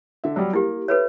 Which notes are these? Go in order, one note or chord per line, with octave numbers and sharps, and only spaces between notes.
D3 E5
F#3 G3
A#3 E4 G4
E4 A4 B4 C#5